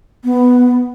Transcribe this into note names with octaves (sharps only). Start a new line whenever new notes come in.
B3